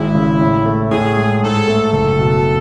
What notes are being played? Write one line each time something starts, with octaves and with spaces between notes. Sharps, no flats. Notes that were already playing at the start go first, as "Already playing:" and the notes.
Already playing: G#1 G#3 E4
C#3
A2
A3
A2 G#4
G#3
G#2 A4
A3
F#1 A4
B2